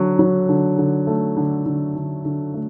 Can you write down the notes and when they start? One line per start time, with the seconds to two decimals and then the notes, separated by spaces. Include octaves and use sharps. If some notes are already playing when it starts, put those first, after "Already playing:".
Already playing: D3 F#3
0.19 F#3
0.49 D3
0.78 D3
1.07 A3
1.37 D3
1.66 D3
1.95 D3
2.25 D3
2.54 A3